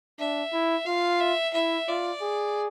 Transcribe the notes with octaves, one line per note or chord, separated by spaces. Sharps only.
D4 E5
E4
F4 F5
E5
E4 E5
F4 D5
G#4